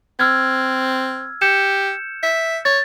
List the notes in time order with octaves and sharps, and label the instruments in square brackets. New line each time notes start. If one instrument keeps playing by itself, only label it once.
[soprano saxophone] C4 [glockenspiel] E6 F6 G#6
[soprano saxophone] G4 [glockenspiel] G6 C#7 E7
[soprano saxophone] E5
[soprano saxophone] C#5 [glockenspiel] A6